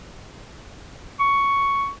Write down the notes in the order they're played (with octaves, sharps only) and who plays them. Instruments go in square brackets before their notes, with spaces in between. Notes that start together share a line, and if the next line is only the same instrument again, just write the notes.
[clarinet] C#6